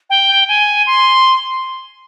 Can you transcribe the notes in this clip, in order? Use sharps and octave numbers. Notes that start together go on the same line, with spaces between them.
G5
G#5
C6